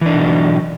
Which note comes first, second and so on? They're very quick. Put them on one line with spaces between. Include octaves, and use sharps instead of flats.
E3 D4 D#4 B2 F#3